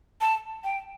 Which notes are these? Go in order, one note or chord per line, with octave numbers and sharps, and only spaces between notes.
A5
G5